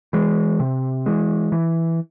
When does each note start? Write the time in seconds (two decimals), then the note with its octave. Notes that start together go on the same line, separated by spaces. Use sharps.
0.13 E3 G#3
0.60 C3
1.06 E3 G#3
1.52 E3